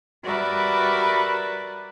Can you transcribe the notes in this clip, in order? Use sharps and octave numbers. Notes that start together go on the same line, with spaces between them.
G3 F#4 A#4 B4 D5 E5